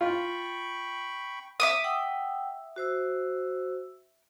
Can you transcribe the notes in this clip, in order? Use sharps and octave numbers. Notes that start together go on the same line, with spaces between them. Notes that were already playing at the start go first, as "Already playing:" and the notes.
F4 G5 B5 C#6
E5 D6 D#6
F#5 G5 E6
F#4 C5 E6